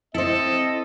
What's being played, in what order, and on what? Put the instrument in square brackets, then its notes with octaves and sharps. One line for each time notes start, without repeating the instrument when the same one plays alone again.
[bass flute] C4 [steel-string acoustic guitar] E4 C5 [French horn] A4 [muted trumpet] D#5